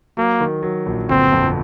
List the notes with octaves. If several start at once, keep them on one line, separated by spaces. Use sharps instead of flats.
F#3 A#3
D#3
F#3
A#1
G1 C4
F2